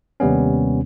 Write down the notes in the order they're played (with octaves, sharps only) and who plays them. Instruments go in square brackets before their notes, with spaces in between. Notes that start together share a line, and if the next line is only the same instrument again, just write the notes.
[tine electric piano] D#2 C3 G3 B3 C#4